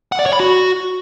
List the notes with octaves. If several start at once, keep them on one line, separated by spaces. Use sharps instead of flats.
F#5
D5
C#5
B5
F#4